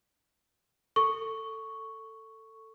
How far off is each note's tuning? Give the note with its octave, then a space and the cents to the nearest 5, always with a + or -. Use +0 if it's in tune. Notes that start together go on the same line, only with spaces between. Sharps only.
A4 +15 C#6 +0